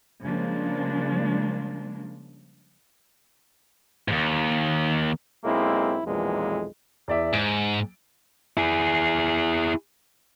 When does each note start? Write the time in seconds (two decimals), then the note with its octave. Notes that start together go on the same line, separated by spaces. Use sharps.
0.24 C#3 F3 G3 G#3 A#3 D4
4.08 D#2 G#2
5.44 B1 G#3 A#3 C4 E4
6.05 B1 F2 A#2 E3 G#3
7.08 E2 D5 E5
7.33 G#2 D7
8.57 E4 G#4